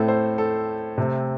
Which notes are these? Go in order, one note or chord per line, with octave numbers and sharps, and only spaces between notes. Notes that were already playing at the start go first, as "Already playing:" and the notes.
Already playing: A2 A3 C4 A4
C5
A4
C3 A3 C4